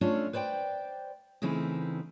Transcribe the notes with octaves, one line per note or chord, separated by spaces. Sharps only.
A3 C#4 D4 F4 A4
B4 C5 D5 F#5 G5
C#3 E3 A3 C4 D#4 E4